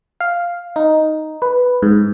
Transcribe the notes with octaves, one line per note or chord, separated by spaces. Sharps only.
F5
D#4
B4
G#2